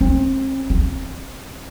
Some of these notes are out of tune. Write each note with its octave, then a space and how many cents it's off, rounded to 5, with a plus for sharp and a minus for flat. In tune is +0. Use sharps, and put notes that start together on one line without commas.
C4 +35
C4 +30